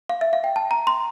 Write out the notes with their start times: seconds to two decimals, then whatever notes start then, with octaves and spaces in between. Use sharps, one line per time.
0.09 F5
0.21 E5
0.33 F5
0.44 G5
0.56 A5
0.71 A#5
0.87 C6